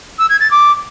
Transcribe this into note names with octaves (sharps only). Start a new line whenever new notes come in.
E6
G#6
A6
D6